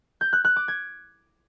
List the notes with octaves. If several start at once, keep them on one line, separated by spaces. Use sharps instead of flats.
G6
F#6
F#6
D6
G#6